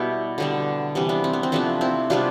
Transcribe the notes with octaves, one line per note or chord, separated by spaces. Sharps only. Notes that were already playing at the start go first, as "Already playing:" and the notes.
Already playing: B2 G3 B3 E4 G4
D3 G3 B3
C3 E3 G3
B3 D4
C4
B3
C4
C3 F3 A3 B3 D4
C4 E4
C3 G3 B3 D4 F4